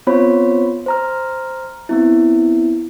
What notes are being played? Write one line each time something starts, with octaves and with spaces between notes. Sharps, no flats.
B3 C4 F4 C5 C#5 B5
C5 A#5 F6
B3 C4 E4